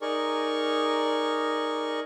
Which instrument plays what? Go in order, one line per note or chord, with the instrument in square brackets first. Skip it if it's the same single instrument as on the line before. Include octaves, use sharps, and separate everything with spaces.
[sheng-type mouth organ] D#4 G#4 A#4 D5 C#6